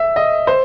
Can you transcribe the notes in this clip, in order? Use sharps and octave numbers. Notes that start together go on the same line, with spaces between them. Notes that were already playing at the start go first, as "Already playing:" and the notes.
Already playing: E5
D#5
C5